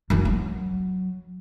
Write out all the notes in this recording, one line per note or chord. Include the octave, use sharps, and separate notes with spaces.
F#2 E3
F#3